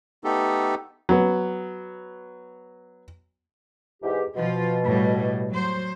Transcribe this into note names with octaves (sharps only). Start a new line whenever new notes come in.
A3 B3 D#4 G4 A4
F#3 B3
E2 G#2 G4
B2 F3 F4
A2 G3
F#3 C5